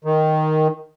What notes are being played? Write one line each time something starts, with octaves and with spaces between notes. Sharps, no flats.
D#3